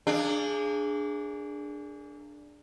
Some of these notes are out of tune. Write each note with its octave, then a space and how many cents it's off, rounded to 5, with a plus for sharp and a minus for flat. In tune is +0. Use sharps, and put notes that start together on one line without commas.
A#3 -30 D4 +0 G#4 +0